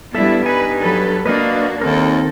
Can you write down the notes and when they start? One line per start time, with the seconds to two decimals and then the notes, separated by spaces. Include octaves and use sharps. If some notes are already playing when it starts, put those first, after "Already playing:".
0.15 G2 G3 B3 E4 A4 E5
0.46 D#4 B4 G#5
0.80 F#3 A4 B4
1.26 A#3 D4 F#4 B4 D#5 F5
1.81 D#2 D#3 C4 A4 A#4